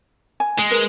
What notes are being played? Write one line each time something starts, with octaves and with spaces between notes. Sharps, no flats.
G#5
G#3
A#4 B4